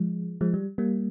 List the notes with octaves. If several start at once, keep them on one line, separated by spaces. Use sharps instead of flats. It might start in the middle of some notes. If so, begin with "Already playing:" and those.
Already playing: F3 G#3
F3 G#3
G3
G3 A#3